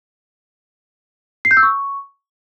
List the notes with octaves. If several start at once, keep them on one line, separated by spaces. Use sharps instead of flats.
C7
G6
E6
C#6